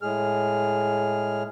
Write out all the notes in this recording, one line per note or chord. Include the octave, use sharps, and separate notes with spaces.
A2 G#3 G#4 F6